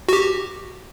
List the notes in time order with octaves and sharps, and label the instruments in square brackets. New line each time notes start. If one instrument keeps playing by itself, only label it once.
[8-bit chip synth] F#4 G4